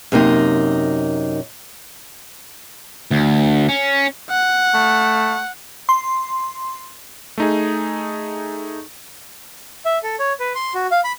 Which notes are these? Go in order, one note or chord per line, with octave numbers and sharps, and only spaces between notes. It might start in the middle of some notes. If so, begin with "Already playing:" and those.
F#2 C3 A#3 D#4
D2
C#4
F#5
A3
C6
A3 D#4 G#4
E5
A4
C#5
B4
C6
F#4
F5
B5